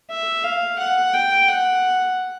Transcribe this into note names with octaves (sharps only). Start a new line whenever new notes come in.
E5
F5
F#5
G5
F#5